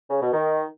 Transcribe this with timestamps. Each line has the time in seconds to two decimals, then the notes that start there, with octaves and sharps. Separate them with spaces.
0.10 C#3
0.21 B2
0.33 D#3